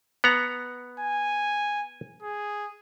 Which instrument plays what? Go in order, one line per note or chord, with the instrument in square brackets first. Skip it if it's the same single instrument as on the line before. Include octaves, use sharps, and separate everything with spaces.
[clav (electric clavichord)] B3 F#5 A#5
[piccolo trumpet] G#5
G#4